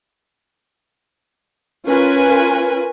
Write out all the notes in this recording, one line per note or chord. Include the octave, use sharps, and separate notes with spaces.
C#4 F4 A#4 B4 G#5